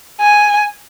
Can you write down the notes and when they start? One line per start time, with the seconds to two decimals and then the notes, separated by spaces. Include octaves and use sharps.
0.21 G#5